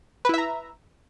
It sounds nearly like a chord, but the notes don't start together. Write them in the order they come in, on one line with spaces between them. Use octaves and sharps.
B4 E4 E5 A#5